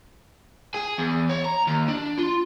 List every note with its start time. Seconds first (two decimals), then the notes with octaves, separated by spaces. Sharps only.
0.74 G#4
0.98 E2
1.29 C#5
1.44 A#5
1.67 D#2
1.88 D4
2.18 F4